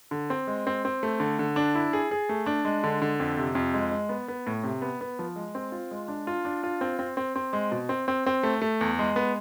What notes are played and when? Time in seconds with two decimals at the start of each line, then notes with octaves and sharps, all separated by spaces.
0.11 D3
0.30 C4
0.47 G#3
0.67 C4
0.85 C4
1.03 A3
1.20 D3
1.39 D3
1.56 D4
1.75 E4
1.93 G#4
2.11 G#4
2.29 A3
2.46 D4
2.65 G#3
2.83 D3
3.02 D3
3.20 F2
3.37 C3
3.55 F2
3.74 G#3
3.91 G#3
4.09 B3
4.28 B3
4.47 A2
4.63 C3
4.82 B3
5.01 B3
5.19 F3
5.36 G#3
5.55 C4
5.72 F4
5.91 G#3
6.08 D4
6.27 F4
6.45 D4
6.63 F4
6.81 C4
6.99 C4
7.17 C4
7.36 C4
7.53 G#3
7.72 B2
7.89 C4
8.08 C4
8.26 C4
8.43 A3
8.62 A3
8.81 E2
8.99 G#3
9.16 B3